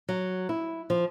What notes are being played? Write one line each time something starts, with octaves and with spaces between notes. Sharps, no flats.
F#3
E4
F3